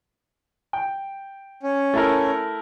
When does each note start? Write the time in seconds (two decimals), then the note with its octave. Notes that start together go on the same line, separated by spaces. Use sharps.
0.73 G5
1.63 C#4
1.94 A3 E4 A#4